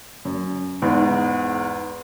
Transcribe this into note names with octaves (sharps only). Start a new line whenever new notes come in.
F#2
E2 G#2